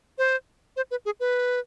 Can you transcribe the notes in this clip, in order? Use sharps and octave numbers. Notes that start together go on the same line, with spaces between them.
C5
C5
B4
G#4
B4